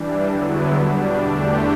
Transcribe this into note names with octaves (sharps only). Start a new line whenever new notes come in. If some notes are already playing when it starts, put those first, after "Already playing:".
Already playing: E3 G3 D4
E2 D3 F#3 B3 E4
B2 G3 D4
E2 D3 A3 D4 G4